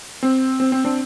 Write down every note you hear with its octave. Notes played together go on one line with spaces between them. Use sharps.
C4
C4
C4
C4 D4